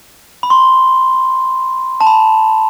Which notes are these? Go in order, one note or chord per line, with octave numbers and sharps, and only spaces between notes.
B5
C6
A5
B5